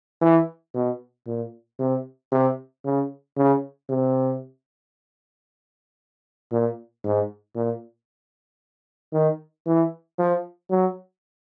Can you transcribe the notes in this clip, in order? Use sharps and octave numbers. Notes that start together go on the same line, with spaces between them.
E3
B2
A#2
C3
C3
C#3
C#3
C3
A#2
G#2
A#2
D#3
E3
F3
F#3